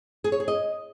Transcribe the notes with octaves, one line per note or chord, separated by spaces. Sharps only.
G#4
C#5
G#4
D#5